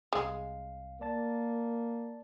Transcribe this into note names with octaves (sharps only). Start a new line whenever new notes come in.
C2 G#3 F5
A#3 D5 A5 A6